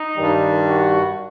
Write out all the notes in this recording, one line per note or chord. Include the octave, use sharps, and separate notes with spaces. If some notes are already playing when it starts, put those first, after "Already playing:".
Already playing: D#4
G2 D#3 G3
F#4